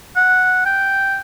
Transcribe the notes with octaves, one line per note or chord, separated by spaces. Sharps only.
F#5
G5